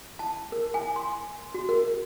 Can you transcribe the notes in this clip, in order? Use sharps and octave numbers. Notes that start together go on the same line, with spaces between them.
A5
A#4
G#5
C6
F#4
A#4